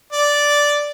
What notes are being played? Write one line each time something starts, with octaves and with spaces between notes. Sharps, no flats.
D5